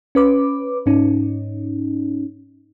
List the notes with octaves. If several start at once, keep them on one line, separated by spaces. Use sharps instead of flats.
C#4 B4 D6
G#2 C#4 D#4